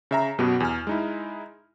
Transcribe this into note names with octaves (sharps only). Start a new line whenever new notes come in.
C#3 E5 A#5
F#2 B2 B3 F#4 G4
E2 G#5 F6
G#3 D#4 E4